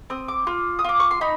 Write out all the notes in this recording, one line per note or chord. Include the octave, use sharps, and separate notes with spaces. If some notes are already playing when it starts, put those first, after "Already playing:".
C4 D#6
D6
F4
D#6
F4 D6
C#6
C6
D#4 B5